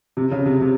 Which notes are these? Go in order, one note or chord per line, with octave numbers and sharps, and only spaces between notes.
C3
C#3
C3
C3